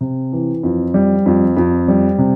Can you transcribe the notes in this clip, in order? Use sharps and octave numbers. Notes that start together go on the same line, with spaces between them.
C3
E3
F2
G3
F2
F2
G3
C3